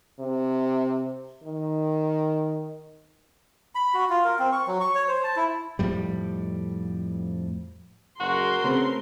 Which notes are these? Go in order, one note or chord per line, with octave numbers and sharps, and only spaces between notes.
C3
D#3
B5
F#4
F4
A#4
C4
C#6
F#3
C#6
C#5
C5
A5
E4
F2 A2 G3
F#1 F#4 A#4 C6
C#3 A3 C4 B4